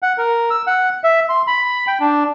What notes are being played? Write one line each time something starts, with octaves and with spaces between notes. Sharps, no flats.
F#5
A#4
E6
F#5
E5
C6
B5
G5
D4